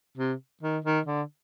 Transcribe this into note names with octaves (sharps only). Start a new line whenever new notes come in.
C3
D#3
D#3
D3